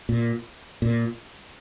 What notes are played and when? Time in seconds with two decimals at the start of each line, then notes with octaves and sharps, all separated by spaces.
0.09 A#2
0.82 A#2